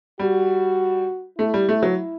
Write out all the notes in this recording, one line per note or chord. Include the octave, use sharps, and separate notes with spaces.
G3 F#4
A3 E4
G3
A3
F#3